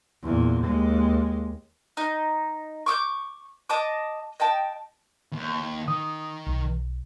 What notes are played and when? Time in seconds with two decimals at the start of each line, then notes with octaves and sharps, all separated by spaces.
0.23 E2 A#2
0.65 D#2 G#3
1.97 D#4
2.86 C#6 D6 E6 G6
3.70 D#5 A5 D6
4.40 D#5 G5 A5
5.32 D#2
5.88 D#3 D#6
6.47 B1